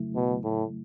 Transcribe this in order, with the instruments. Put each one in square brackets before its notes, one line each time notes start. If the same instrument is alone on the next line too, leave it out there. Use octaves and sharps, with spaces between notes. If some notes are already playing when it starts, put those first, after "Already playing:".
Already playing: [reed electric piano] C#3 F#3 A3 E4
[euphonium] B2
A2